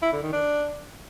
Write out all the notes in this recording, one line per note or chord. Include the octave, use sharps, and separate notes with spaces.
E4
D3
D#3
D4